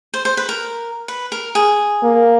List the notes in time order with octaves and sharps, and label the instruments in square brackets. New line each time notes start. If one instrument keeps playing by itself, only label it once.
[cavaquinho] C5
C5
B4
A#4
B4
A#4
G#4
[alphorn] A#3